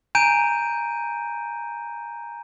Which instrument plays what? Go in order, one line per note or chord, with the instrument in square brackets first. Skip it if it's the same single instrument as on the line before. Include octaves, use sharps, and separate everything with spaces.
[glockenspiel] G#5 A#5 G6 D7 D#7